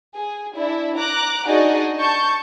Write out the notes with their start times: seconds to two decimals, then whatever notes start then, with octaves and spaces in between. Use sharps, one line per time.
0.14 G#4
0.54 D4 E4
0.96 A#5 D6 F#6
1.47 D4 D#4 F#4 G#4 D5 D#5
1.97 A5 C#6 G6